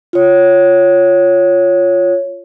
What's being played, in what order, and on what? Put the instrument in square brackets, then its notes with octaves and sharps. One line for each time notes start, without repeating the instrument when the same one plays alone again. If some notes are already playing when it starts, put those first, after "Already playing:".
[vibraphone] F4 C#5